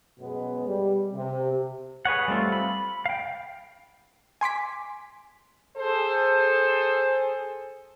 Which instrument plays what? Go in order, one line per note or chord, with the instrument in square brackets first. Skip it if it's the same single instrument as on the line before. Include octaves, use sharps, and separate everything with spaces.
[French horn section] F#2 B2 G#3 B3
G3
C3
[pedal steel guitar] G#4 B4 C#5 F#5
G3 A3 C4 F4
B5
F5 G5
[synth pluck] G#5 C6 D6 B6
[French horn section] G#4 A4 C5